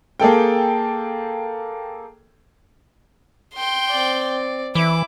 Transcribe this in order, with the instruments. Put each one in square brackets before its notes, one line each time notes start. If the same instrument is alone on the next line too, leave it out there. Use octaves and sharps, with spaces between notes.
[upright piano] A#3 G#4 A4 G5
[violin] G5 C6
[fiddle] C4 D5
[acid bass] E3 [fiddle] E4 [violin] D6